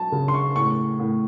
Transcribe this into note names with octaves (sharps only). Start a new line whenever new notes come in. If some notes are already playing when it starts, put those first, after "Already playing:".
Already playing: F#3 A5
C#3
C6
C#6
A2 C#6
A2